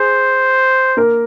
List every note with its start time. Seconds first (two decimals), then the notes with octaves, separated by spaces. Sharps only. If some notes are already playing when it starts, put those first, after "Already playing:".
Already playing: G#4 C5
0.97 A#3 A#4